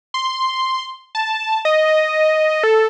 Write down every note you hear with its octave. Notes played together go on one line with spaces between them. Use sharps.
C6
A5
D#5
A4